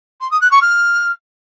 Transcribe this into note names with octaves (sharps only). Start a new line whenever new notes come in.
C6
D#6
F#6
C#6
F6